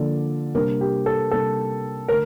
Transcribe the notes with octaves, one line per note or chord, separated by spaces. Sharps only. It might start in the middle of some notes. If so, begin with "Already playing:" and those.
Already playing: D3 F3 A#3 F4 A4 D5
C3 G3 A#3 D4 A#4
G4
A4
C3 G3 A#3 D4 A4
D3 A3 A#4